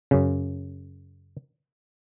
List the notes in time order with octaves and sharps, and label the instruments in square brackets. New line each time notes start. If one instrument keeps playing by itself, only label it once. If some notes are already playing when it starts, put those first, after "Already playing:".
[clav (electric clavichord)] F#2 C#3